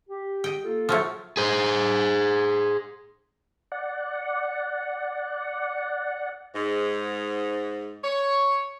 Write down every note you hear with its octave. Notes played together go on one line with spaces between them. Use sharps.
G4
D#5 G5
A#3 F4 A4
F3 F#3 A3
G#4 C5
D5 F#5
G#2
C#5